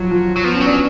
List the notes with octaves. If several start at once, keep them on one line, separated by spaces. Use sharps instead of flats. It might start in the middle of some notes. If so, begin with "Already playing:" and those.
Already playing: F3 F#3
F3
F#3
F3 B3
C#4
F#3
D4